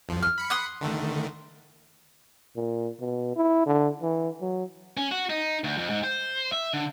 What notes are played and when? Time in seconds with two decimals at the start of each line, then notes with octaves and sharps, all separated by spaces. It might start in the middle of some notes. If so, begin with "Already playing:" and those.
0.09 F2 F3
0.23 F6
0.38 B5 C#7
0.50 C6 D#6 F#6
0.81 D3 D#3 A3
2.56 A#2
3.00 B2
3.36 E4
3.66 D3
4.02 E3
4.41 F#3
4.97 C#4
5.11 F#4
5.30 D#4
5.64 D2
5.78 F2
5.90 G#2
6.04 C5
6.52 E5
6.73 D3